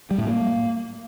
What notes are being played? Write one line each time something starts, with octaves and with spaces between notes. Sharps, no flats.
G3
A2
A#3